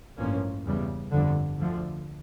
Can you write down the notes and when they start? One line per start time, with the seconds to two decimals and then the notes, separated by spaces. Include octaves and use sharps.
0.17 A1 G2 F3 A#3 C#4
0.64 E2 C#3 G3
1.11 G1 F2 D3
1.58 D2 D3 F3 A3